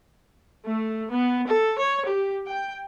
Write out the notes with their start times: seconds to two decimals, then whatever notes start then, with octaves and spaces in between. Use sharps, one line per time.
0.68 A3
1.11 B3
1.50 A4
1.80 C#5
2.10 G4
2.49 G5